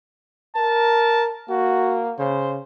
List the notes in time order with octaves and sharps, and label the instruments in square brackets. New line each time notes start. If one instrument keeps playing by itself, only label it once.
[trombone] A#4 [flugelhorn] A5
[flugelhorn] A#3 [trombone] F#4
[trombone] C#3 [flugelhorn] C5